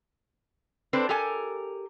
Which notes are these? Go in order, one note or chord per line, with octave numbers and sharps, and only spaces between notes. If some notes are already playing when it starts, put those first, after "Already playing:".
C4 D4 A4 B4 C5
G4 A4 A#4 G#5